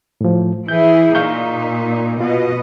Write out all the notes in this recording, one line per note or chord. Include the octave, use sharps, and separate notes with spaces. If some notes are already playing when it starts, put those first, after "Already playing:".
A2 F3
E3 E4 G#4 G6
A#2 D#4 F5 C#6 G6
B2 F4 D#5